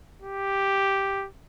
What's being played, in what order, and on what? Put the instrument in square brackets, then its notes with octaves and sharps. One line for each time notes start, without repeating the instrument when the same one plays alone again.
[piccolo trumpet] G4